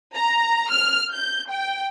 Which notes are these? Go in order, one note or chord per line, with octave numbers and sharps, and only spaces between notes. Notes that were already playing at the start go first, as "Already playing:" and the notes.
A#5
F6
G6
G5